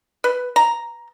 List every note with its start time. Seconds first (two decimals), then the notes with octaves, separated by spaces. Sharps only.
0.24 B4
0.56 A#5